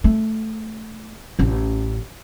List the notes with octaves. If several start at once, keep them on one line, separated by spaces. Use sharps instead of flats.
A3
A1 C#4